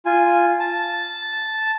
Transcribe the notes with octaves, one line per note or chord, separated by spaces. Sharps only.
F4 G#5
A5